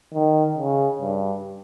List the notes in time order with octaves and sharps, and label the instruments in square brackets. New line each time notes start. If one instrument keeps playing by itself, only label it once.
[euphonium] D#3
C#3
G2